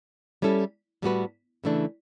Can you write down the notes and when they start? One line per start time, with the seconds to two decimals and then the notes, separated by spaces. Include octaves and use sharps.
0.42 G3 C#4 E4 A4
1.02 A2 G3 B3 F#4 B4
1.64 C#3 E3 A3 D4